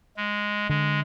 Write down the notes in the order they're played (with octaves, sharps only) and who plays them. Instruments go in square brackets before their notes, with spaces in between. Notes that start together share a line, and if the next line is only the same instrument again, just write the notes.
[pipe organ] G#3
[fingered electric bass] D3 [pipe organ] G#3